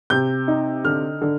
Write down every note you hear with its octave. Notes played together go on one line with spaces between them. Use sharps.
C3 G6
D#4
D3 F6
D3